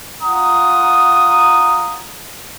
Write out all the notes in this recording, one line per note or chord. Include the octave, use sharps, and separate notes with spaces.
F4 F#5 A#5 D#6